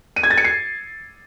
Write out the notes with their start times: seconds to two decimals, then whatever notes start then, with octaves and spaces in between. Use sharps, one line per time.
0.16 D#7
0.23 G#6
0.30 A6
0.37 C#7
0.45 C7